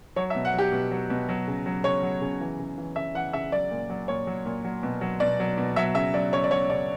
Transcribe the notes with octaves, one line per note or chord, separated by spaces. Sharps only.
F#3 C#5
E5
B2
F#5
F#3 G4
B2
F#3
B2
F#3
C#3
F#3
C#3 C#5
F#3
C#3
E3
C#3
E3
C#3 E5
E3 F#5
C#3 E5
F#3 D5
A#2
F#3
A#2 C#5
F#3
A#2
F#3
B2
F#3
B2 D5
F#3
B2
F#3 E5
C#3 E5
F#3 D5
C#3 C#5
D5
F#3 C#5
C#3 D5